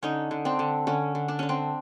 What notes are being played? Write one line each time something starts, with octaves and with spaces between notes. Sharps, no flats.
D3 C#4 D#4
D3
C4 D4
D3
D3 C#4
D3
D4
D3 C#4
C4 D4